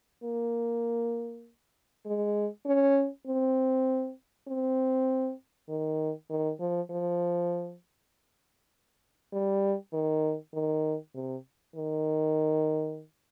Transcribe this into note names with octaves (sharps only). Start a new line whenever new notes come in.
A#3
G#3
C#4
C4
C4
D#3
D#3
F3
F3
G3
D#3
D#3
C3
D#3